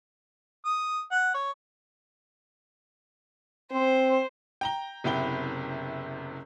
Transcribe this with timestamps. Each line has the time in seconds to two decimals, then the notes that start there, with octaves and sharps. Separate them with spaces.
0.65 D#6
1.11 F#5
1.34 C#5
3.72 C4 C5
4.61 G5 A#5 G7
5.04 F#1 C3 B3 E4 G5 G7